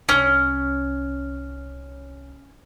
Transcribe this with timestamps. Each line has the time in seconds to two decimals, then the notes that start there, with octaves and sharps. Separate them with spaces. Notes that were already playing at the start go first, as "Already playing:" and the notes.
0.09 C2 C#4 D#4